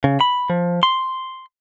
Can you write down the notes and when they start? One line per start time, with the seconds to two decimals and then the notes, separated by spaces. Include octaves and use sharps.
0.04 C#3
0.21 B5
0.50 F3
0.83 C6